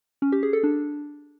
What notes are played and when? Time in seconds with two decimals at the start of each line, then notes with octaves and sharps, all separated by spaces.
0.22 C#4
0.32 G4
0.43 G#4
0.53 A4
0.63 D4